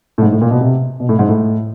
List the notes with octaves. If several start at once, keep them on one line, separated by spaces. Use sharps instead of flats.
A2
G#2
A2
A#2
B2
C3
B2
A2
G#2
A2